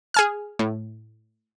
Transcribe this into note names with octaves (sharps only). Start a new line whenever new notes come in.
G#4 G#5 F6
A2